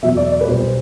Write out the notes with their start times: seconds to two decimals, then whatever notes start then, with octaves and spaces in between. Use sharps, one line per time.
0.02 E2 B2 F#3 E5
0.17 D5
0.32 D5
0.41 B4
0.46 B1 B2 G3 C5